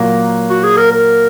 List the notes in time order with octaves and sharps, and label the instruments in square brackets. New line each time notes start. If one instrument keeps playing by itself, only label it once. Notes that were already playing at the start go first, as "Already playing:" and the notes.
Already playing: [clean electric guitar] A#2 F#3 A#3
[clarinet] F#4
G#4
A#4
A#4